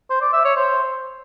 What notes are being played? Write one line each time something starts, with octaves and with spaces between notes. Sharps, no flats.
C5
D5
E5
C#5
C5